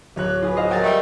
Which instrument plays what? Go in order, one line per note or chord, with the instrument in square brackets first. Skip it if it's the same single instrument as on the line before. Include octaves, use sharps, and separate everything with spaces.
[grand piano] D1 C#5 F#6
[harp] F4 G#4 B4
C5 D#5 F5
[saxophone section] F#3 [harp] A#4 G5 A6
[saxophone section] G3 A3